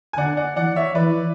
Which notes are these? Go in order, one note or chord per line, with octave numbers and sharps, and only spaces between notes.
G#5
D3 D5 F#5
D5 F#5
E3 D5 F#5
C#5 E5
E3 B4 D5